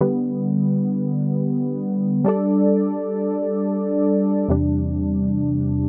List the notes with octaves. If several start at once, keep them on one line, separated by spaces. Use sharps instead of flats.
D3 G3 B3
G3 D4 A4 D5
E2 C3 G3 D4